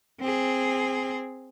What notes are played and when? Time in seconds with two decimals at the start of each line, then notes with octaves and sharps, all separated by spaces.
0.21 C4 G#4